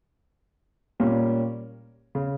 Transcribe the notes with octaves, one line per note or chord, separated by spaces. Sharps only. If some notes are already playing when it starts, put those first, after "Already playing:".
A#2 G3 A#3 C#4
C#3